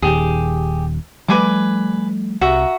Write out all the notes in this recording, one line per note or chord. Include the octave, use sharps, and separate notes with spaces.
D#1 G#1 D#2 G4 G#4
F3 G3 A3 B4 G#5 D6
C2 F#4 E5 A#5